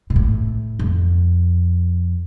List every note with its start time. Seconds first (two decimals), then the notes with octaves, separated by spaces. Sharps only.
0.10 B2
0.16 A2
0.79 F2